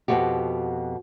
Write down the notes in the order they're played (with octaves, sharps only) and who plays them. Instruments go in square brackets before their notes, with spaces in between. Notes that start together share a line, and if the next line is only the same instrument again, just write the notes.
[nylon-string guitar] F2 B2 F3 G#3 F#4 G4